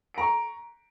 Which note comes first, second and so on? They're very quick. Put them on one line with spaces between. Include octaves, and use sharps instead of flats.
D7 A#5 C#6